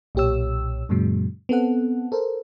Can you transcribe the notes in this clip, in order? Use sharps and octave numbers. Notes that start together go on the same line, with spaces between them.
B1 A#2 G4 C#5 E6
F#2 A#2 C#3 F#3 G#3
B3 C4 A4 F#5
A4 A#4 C5